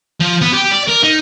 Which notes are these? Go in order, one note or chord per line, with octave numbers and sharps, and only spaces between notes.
F3
B3
G4
D5
A#4
D#4